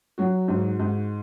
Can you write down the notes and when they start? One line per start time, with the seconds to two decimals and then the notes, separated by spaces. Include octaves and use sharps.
0.18 F#3 F#4
0.48 G#2
0.79 G#2